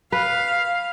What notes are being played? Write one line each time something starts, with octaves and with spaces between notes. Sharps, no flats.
B4 F5